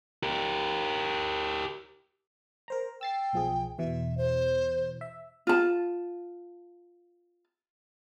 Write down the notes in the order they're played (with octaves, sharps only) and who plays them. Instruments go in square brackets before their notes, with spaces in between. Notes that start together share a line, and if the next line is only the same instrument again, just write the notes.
[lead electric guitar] G4 A#4
[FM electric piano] A#4 C5 A#5
[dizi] G5 [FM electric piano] E6 A6 C7
[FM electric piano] B1 F3 G#4
[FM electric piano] E2 B2 E3 [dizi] E5
[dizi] C5
[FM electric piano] E5
[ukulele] F4 A5